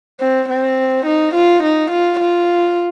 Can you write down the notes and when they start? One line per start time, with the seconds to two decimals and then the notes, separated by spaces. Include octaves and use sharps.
0.20 C4
0.49 C4
1.06 D#4
1.34 F4
1.63 D#4
1.91 F4
2.19 F4